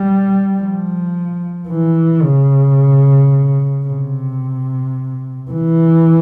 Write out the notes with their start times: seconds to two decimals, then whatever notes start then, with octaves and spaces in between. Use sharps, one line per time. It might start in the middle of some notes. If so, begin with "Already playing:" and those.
Already playing: G3
0.60 F3
1.68 E3
2.23 C#3
3.87 C3
5.51 E3